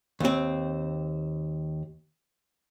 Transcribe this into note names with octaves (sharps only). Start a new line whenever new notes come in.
D#2 C4